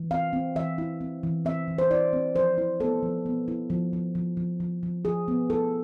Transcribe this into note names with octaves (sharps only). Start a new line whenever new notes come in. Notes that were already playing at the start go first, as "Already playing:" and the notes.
Already playing: E3
C4 F5
C4
E3 E5
E4
C4
E3
C4 E5
E3
C5
E4 D5
C4
F3 C5
E4
B3 A4
F3
B3
E4
F3
F3
F3
F3
F3
F3
F3 G#4
B3
E4 A4